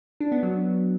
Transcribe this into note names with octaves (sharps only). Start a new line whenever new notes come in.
D4
B3
F#3